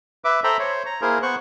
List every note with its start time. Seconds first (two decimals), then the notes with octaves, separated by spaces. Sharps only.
0.25 B4 E5 D6
0.44 A4 C5 E5 G5 A#5 B5
0.59 C5 C#5
0.86 A#5
1.01 A#3 E4 G#4 A#4 C5
1.23 B3 C5 C#6 F#6